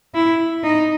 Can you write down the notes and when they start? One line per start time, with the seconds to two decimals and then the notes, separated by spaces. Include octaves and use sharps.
0.14 E4
0.64 D#4